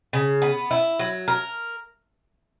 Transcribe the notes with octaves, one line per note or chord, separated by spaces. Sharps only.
C#3
B3
E4
F#3
A#4